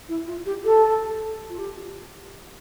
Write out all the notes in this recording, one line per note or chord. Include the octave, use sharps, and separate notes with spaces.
E4
F4
G4
A4
F4
G4